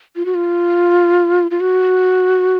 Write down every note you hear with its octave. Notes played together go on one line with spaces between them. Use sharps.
F4
F#4
F4
F4
F#4